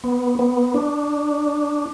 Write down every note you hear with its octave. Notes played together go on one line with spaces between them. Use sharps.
B3
B3
D4